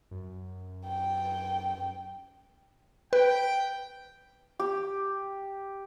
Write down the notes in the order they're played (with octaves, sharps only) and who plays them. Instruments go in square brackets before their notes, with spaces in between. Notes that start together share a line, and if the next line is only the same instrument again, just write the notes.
[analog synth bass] F#2
[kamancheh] G5
[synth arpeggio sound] B4 [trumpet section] G5
[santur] G4